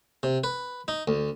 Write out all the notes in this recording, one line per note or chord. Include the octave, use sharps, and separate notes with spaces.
C3
B4
D#4
D2